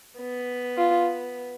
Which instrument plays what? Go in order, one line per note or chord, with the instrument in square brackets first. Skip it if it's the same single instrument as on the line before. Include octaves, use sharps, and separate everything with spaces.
[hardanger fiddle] B3
[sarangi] F4